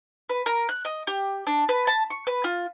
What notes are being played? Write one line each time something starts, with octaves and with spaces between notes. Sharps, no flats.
B4
A#4
F#6
D#5
G4
D4
B4
A5
C#6
B4
F4